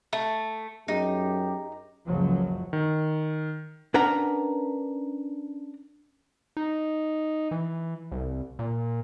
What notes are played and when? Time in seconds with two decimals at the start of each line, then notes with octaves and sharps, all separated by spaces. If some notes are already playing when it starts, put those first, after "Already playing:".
0.13 A3
0.88 F#2 D#4 G4 G#4
2.07 F#1 C#2 F#2 C#3 F3 F#3
2.73 D#3
3.94 C#4 D4 A#4 B4 F#5 A#5
6.57 D#4
7.51 E3
8.12 C2
8.59 A#2